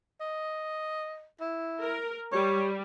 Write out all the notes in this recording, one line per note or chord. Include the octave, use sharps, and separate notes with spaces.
D#5
E4
A#4
G3 C#5